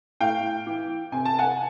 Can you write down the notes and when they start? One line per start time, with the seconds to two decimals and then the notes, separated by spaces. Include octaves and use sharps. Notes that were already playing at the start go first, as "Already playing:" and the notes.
0.21 A2 F5 G5
0.66 E3
1.12 C3 G#5
1.25 A5
1.38 F#5 G#5